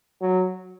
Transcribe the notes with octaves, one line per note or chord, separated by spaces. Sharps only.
F#3